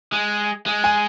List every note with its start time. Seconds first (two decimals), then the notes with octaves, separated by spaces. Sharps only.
0.12 G#3
0.66 G#3
0.84 G#5